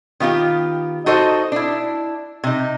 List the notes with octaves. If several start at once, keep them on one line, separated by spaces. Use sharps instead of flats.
D#3 B3 F4 G4
D#4 F#4 A4 C5 D#5
D4 E4
C3 D#4